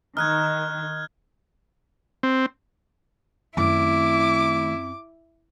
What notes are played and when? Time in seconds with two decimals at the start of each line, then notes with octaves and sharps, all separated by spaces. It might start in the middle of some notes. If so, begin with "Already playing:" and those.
0.17 D#3 D#4 F6 F#6 G#6
2.23 C4
3.57 F#2 D#3 A3 C4 E4 D6